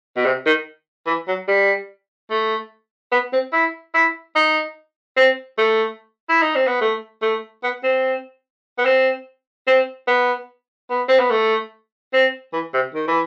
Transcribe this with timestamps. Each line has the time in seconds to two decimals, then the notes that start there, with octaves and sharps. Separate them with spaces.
0.17 B2
0.26 C3
0.46 D#3
1.07 E3
1.28 F#3
1.48 G3
2.30 A3
3.12 B3
3.33 C4
3.53 E4
3.94 E4
4.36 D#4
5.17 C4
5.58 A3
6.29 E4
6.42 D#4
6.55 C4
6.67 B3
6.81 A3
7.22 A3
7.63 B3
7.83 C4
8.78 B3
8.85 C4
9.67 C4
10.08 B3
10.90 B3
11.09 C4
11.19 B3
11.31 A3
12.13 C4
12.53 E3
12.74 C3
12.95 D#3
13.08 E3